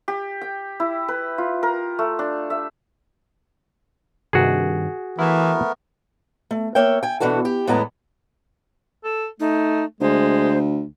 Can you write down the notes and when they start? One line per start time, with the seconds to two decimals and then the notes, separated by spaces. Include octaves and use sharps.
0.08 G4
0.41 G5
0.80 E4
1.08 B4
1.38 F4
1.63 A#4
1.99 A3
2.19 D4
2.50 E5
4.33 G2 C3 D#3 F#4 G#4
5.19 E3 A3 B3 E4 A#4
6.51 A3
6.75 A#3 C#5 E5 G5
7.03 G5 G#5
7.20 B2 D#3 E3 D4 F#4 A4
7.45 G4
7.67 E2 A2 G#3 B3 A5 A#5
9.04 A4
9.40 A3 D#4
10.01 D2 G#3 C5